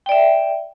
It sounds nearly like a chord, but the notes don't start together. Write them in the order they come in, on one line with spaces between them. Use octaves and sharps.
G5 D5 E5